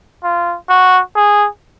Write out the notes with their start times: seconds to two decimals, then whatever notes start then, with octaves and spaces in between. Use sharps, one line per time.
0.24 F4
0.69 F#4
1.16 G#4